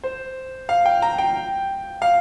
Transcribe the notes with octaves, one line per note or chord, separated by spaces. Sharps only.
C5
F5
G5
A#5
G5
F5